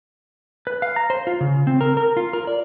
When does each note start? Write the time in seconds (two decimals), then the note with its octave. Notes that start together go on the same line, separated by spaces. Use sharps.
0.67 B4
0.82 F5
0.96 A#5
1.10 C5
1.27 F4
1.41 C#3
1.67 C4
1.81 A#4
1.97 A#4
2.17 F4
2.33 A#4
2.47 D5